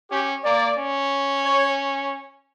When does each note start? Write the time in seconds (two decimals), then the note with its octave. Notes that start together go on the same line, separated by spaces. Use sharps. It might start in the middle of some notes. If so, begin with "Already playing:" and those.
0.11 C#4 G4
0.45 A#3 D5
0.78 C#4
1.45 C#5